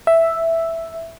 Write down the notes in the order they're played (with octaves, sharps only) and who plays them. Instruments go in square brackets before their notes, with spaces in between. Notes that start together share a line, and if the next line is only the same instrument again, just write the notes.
[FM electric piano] E5